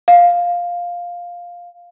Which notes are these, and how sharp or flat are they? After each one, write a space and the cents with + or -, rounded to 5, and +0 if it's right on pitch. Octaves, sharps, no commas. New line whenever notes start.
F5 +5